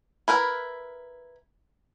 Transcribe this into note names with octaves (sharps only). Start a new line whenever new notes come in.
E4 A#4 B4